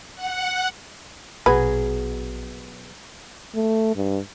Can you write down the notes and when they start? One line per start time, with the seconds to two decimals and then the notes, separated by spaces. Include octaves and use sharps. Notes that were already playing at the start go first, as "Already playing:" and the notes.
0.15 F#5
1.46 A#1 B2 F#3 G#4 B4
3.55 A3
3.96 G2